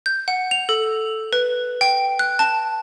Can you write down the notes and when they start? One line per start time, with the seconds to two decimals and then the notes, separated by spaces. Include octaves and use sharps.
0.06 G6
0.28 F#5
0.51 F7
0.69 A4
1.33 B4
1.81 G5
2.19 F#6
2.39 A5